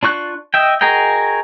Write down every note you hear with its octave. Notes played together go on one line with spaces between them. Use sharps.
D4 F4 C#6 F#6
D#5 E5 G5
F#4 G#4 A#4 D#5 G5